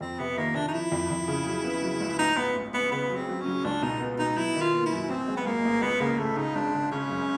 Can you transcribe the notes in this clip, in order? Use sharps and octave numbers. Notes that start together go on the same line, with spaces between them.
F2 C4
C3 B3
D#3 A#3
C3 D4
D#4
F3 E4
F2
F2
C#3
F#3
B3
F#3
C#2
A1 D#4
A1 B3
A1
A1 B3
C#3 B3
F#3
C4
F#3
C#4
F#3
C#2 D4
B2 D#4
B3
B2 D#4
F#3 E4
D#3
F4
A#3
E4
F#2
A1 C4
G#3
B3
G#2 A#3
A1
C#2 B3
C#3 A#3
C#3 A3
C#3 D#4
G#1 D4
C#3
C#3 C#4
F#2